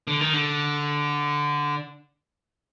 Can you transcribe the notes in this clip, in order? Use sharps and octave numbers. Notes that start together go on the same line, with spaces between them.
D3
D#3
D3